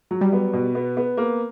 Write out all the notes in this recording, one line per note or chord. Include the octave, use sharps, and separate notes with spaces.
F#3
G3
B3
B2
B3
B3
A#3